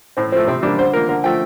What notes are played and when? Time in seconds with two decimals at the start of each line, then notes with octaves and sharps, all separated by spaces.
0.17 A2 C4
0.32 F3 C4
0.36 A3
0.47 C3 C4
0.63 G3 A#3 D4
0.79 D3 C5
0.93 F3 A#3 A#4
1.09 D3 A#4
1.24 F3 A3 G5